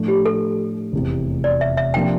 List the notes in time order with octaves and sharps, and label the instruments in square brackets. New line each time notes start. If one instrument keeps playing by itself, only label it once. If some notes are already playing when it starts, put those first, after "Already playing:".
Already playing: [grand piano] A2 F3 A3 D4
[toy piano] G4
A4
[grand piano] F1 E2 C3
[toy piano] D5
E5
E5
[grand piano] C3 F3 A#3 D4 [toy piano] G5